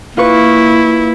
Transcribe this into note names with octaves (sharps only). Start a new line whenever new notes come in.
A#3 E4 F4 B4 C#6